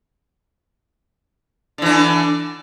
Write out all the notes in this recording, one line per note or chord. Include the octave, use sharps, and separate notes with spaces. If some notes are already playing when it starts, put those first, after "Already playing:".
D3 E3 D4